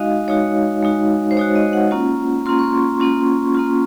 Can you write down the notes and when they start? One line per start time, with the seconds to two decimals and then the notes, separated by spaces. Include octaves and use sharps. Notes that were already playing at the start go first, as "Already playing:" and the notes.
Already playing: G#3 D#4 F#4 D#5 F5
0.28 G#3 D#4 F#4 C#5
0.83 G#3 D#4 F#4
1.31 C5
1.37 G#3 D#4 F#4 C#5
1.56 D#5
1.73 F#5
1.91 A#3 C#4 F4
2.46 A#3 C#4 F4 C6
2.59 C#6
2.64 C6
3.00 A#3 C#4 F4
3.55 A#3 C#4 F4